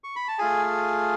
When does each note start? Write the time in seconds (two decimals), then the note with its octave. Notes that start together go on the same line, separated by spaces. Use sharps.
0.04 C#6
0.16 B5
0.28 A5
0.39 A3 F4 G#4 G#5